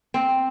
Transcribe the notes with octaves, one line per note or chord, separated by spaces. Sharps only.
C4